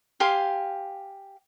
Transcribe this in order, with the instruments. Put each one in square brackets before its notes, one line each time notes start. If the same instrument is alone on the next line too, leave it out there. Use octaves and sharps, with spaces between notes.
[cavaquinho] G4 F5 G#5 C6